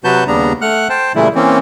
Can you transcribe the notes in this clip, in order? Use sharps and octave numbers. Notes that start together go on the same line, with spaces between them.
C3 F#3 F#4 B4 A5 G6
D#2 C#3 G3 B3 D4 A#5
A3 F#5 F6 F#6
C5 G5 A5
A#2 C#3 E3 G3 A3 E4
E3 A#3 C4 C#4